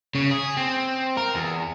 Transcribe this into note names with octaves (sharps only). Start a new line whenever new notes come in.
C#3
G#4
C4
A#4
E2